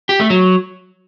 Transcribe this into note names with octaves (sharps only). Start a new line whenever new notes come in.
G4
A3
F#3